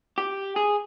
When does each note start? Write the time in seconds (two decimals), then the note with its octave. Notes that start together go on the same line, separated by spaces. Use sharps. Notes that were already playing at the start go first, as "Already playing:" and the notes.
0.18 G4
0.56 G#4